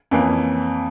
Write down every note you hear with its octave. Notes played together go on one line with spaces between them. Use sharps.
F2 E3 A#3 C#4